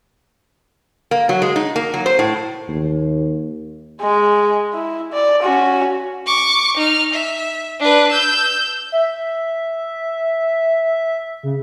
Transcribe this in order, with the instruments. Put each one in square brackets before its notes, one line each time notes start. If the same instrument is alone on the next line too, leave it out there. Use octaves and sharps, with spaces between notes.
[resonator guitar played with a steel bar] A#3
F#3
G#3
D#4
A#3
F#3
C5
A2
[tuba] D#2
[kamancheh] G#3
E4
D5
C#4 F#4
[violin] C#6 D6
D#4 F6
E5
D4 B4
E6 G6
[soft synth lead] E5
C#3